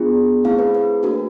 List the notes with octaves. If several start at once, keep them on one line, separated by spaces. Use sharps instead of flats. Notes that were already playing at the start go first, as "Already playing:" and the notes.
Already playing: B3 D4 F4 G#4
A3 C4 E4 G#4 F5
B4
B4
A#3 D4 F#4 A#4